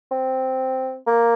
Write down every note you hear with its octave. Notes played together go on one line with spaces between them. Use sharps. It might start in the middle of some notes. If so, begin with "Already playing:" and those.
C4
A#3